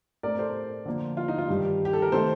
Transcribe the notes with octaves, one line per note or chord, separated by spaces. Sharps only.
A2 A3 C4 A#4 D5
A4 C5
D3 F3 A#3
F4
D#4
F4
G2 D#3 G3
G4
A4
A#4
D#3 A3 C4 A4 C5